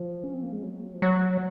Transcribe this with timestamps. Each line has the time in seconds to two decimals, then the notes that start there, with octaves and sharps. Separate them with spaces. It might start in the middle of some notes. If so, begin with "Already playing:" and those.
Already playing: F3
0.24 C#4
0.34 C4
0.43 A#3
0.52 G#3
0.63 F#3
0.94 F3
1.02 F#3